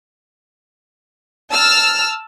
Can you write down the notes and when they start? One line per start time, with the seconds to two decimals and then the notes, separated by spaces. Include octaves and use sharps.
1.50 A5 E6 F6